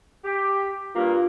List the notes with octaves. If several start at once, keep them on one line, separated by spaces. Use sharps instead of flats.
G4
G2 A#3 F4